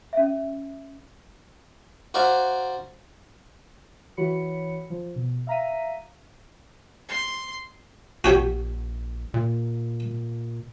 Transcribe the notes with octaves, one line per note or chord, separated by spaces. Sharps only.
C#4 E5
F#4 C5 D5 F5 A#5
E3 F#4 C#5 B5 C#7
F3
B2
E5 F5 A#5 A#6 B6 D#7
C6
A#1 F#4 G4 C#5
A#2